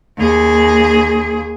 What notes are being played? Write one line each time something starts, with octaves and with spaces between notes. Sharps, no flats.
D#2 G#4